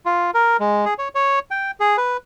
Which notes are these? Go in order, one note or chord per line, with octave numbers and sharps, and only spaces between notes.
F4
A#4
G#3
G#4
C#5
C#5
G5
G#4
B4